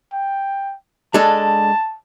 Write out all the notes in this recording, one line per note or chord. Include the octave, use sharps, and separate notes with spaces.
G5
G#3 D4 A4 A5